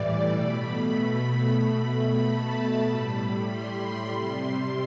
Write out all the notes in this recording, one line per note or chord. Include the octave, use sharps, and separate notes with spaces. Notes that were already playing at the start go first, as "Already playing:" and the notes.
Already playing: A2 E3 G3 D5
B2 A3 B5
B2 A3
A5
A2 G3 B5
C6
C3 G3 C6
C6